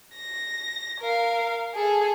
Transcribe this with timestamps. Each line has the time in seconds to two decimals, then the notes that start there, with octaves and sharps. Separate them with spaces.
0.14 A#6
1.00 A#4 F5
1.74 G#4 A4